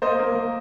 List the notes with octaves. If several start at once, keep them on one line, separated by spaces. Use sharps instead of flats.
A#3 C5 D#5
A#3
A#3